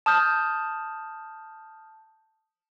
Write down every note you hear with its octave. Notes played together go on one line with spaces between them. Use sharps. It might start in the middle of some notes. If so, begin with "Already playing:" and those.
A5 D#6 F6 G6